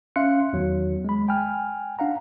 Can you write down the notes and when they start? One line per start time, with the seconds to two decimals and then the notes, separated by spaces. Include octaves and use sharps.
0.16 C#4 E5 F5 C6 F#6 C#7
0.53 E2 D#3 F#3
1.04 G#3 B5
1.28 G5 G#5 F6
1.99 D4 F5 F#5 A#5